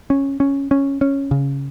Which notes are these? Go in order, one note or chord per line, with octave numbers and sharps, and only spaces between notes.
C#4
C#4
C#4
C#4
C#3